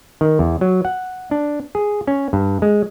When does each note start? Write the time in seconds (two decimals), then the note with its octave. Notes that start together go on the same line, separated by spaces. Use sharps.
0.21 D#3
0.39 E2
0.61 F#3
0.85 F#5
1.31 D4
1.75 G#4
2.07 C#4
2.33 G2
2.62 G#3